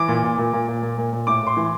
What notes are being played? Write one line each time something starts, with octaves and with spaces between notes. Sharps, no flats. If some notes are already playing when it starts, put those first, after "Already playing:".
Already playing: E3 D6
A#2
A#2
A#2
A#2
A#2
A#2
A#2
A#2
A2 D6
A2 C6
E3